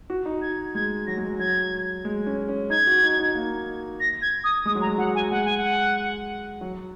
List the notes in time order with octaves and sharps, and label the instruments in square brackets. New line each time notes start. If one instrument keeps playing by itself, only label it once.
[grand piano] F#4
D#4
[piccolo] G#6
[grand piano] G#3 [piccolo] G#6
[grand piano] F#3 [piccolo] A#6
[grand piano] G#3
F#3
[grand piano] F#3 [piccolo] G#6
[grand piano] G#3
C#4
C#4
[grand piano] D#4 [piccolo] G#6
[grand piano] F#4
D#4
D#4
A#3
[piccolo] A#6
G#6
D#6
[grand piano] G#3 [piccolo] D#6
[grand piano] F#3
[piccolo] A#5
[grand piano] G#3
[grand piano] F#3 [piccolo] F#5
[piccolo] G#5
[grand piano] G#3 [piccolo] F#5
[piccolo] G#5
F#5
[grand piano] F#3